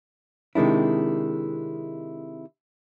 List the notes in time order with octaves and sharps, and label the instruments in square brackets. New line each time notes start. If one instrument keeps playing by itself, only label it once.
[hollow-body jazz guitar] C3 D#3 G#3 D4 E4